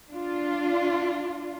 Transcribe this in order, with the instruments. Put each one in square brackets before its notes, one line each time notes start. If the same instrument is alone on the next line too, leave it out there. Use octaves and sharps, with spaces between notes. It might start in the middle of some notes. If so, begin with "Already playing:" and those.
[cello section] D4 F4